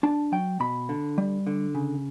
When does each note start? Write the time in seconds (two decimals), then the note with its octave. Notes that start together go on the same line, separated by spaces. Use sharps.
0.03 D4 A5
0.32 F#3 G5
0.60 B2 B5
0.89 D3
1.18 G3
1.47 D3
1.75 C#3